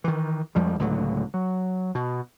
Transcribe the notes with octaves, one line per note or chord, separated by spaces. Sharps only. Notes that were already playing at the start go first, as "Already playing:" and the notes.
D#3 E3
F2 F3 G3 G#3
C#2 A2 D3 F#3
F#3
B2